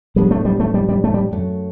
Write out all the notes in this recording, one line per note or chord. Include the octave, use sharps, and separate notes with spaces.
A2 F#3 G3 B3 D4
A3
G3
A3
G3
G3
A3
G3
F#2 F#3 A3